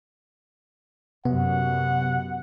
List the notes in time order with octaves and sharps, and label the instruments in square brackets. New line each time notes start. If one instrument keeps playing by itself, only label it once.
[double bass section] F#2 [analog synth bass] C3 [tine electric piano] B3 [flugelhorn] F#5